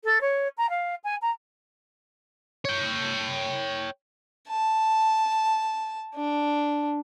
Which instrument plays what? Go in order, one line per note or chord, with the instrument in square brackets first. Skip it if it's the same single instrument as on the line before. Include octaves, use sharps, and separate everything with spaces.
[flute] A4
C#5
A#5
F5
G#5
A#5
[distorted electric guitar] C#5 G5
[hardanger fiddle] A5
D4